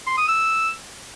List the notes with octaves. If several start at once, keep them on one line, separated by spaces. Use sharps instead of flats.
C6
D#6
E6